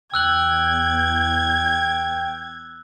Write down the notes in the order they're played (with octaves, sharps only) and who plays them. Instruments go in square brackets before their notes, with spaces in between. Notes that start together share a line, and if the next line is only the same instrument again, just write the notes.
[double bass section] E2 [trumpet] G5 [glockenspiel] E6 F#6 F#7 [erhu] G#6